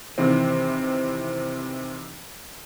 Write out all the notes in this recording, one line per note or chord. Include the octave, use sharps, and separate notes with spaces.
C3 D#3 E3 C4